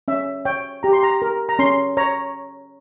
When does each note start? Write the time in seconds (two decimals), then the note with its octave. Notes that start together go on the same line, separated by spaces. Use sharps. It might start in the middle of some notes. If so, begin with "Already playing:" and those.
0.08 C#4 E5
0.45 C#5 G5
0.83 G4 A#5
0.93 C6
1.03 A#5
1.22 A#4
1.49 A#5
1.59 C#4 C6
1.97 C#5 A#5